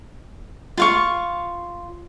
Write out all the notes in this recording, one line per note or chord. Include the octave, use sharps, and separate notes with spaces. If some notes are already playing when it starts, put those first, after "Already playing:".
F4 F5 C#6